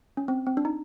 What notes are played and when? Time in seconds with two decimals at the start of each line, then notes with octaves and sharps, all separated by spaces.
0.17 C#4
0.28 C4
0.47 C4
0.57 D4
0.65 D#4